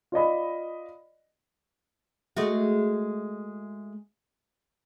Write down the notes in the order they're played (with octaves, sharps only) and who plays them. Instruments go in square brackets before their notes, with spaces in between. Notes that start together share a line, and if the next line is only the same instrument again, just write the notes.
[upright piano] F4 D5 D#5 B5
[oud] G#3 A3 F#4